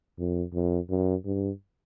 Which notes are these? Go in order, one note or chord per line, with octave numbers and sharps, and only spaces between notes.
F2
F2
F#2
G2